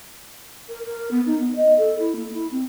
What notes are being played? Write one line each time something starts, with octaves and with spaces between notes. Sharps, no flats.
A#4
A#4
B3
D#4
B3
D#5
A4
E4
A#3
E4
C4